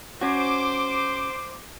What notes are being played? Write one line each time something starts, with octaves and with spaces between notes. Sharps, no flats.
C#4 F#4 C5 D6